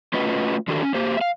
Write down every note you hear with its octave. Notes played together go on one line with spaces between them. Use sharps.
A3 C#4 F4 F#4 B4 D#5
D3 D#3 D4 F#4 G4 A4
C#4
A#3 G4 C5
E5 F5